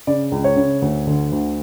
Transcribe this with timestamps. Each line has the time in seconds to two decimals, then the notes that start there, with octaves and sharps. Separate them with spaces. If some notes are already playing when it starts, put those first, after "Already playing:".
0.07 C#3 D5
0.32 C#2
0.44 C#5
0.56 C#3
0.82 D2
1.07 D3
1.32 D2